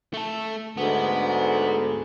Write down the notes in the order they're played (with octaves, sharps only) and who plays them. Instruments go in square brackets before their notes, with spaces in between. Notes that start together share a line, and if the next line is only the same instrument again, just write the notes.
[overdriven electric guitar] A3 A4
[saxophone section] D2 G#2 [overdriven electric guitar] B3